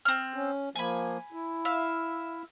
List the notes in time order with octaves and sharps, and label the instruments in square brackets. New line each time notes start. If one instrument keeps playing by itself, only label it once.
[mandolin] C4 F6
[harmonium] C#4
[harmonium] F3 A#3 [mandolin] G#5 B5
[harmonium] E4
[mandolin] E5 F5